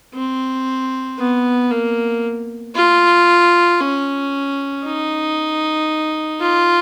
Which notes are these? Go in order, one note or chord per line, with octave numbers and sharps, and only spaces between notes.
C4
B3
A#3
F4
C#4
D#4
F4